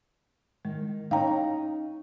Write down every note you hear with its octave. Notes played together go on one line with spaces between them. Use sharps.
D#3 G#3
C#4 D#4 F5 G5 A#5